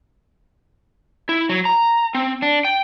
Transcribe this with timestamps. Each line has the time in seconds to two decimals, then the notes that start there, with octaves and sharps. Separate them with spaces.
1.29 E4
1.49 F#3
1.65 A#5
2.15 C4
2.42 D4
2.65 G5